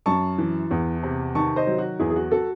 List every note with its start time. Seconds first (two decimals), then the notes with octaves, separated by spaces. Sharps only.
0.06 F#2 A5 C#6
0.38 E3
0.71 E2
1.03 C3
1.35 D#3 A5 C#6
1.56 C5 D#5
1.67 F#3
1.78 F#4
1.99 E2 E4 G#4
2.10 G#4
2.16 F#4
2.31 F#4 A4